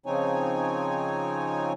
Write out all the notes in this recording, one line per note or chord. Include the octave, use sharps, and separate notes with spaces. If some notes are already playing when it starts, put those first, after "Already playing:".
C#3 F3 C4 D#4 C#5 G#5